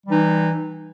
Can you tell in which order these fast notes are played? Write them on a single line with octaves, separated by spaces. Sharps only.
G3 E3 D#4